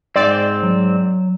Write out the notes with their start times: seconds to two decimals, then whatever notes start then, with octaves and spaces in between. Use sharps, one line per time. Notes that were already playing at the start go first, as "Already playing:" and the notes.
0.16 G#2 C4 D5
0.63 F#3